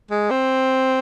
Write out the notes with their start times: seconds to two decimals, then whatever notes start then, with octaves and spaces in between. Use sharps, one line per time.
0.11 G#3
0.31 C4